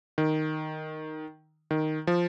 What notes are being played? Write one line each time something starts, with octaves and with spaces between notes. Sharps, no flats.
D#3
D#3
F3